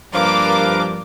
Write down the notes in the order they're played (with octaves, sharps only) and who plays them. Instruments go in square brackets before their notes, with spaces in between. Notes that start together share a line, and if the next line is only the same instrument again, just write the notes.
[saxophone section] G2 F3 [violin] A#3 D4 [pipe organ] A#4 B4 F5 [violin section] D6